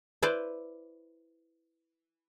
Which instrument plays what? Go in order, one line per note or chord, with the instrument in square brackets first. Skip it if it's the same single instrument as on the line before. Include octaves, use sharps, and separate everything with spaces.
[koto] E4 B4 C5 D5